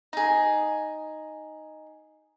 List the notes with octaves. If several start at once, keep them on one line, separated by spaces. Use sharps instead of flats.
D#4 G#4